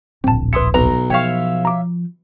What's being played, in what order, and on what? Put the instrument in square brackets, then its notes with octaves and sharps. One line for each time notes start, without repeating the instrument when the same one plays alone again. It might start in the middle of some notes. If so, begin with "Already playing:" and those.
[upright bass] D1 A#1 [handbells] C4 A5
[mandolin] E4 C6 D#6 [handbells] B4 C#7
[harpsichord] B1 [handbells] B4 [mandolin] A#5
[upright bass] F3 [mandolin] C#5 E5 F5 [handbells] G5 C#6
[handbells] A#5 D6